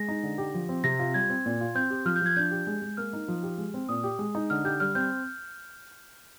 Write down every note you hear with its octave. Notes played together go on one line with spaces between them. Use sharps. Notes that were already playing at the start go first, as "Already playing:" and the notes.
Already playing: G#3 A#6
D#4
D3
G4
F3
C4
C3 A#6
F4
G3 G#6
C4
A#2
F4
C4 G6
G4
F3 F6
G6
F3 G#6
D4 G6
G4
G#3
G#3
A#3 F6
D#4
F3
G4
G#3
C4
A#2 D#6
G4
G#3
D#4
D3 F6
G4 G6
G3 F6
C4 G6